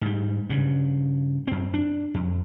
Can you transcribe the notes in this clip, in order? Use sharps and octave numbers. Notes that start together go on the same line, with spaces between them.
G#2 G3
G2 C#3
F#2 C4
D4
F2